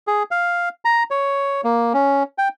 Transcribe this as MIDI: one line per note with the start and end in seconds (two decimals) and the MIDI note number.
0.07 0.23 68
0.31 0.69 77
0.85 1.03 82
1.11 1.61 73
1.64 1.93 58
1.94 2.23 61
2.38 2.48 79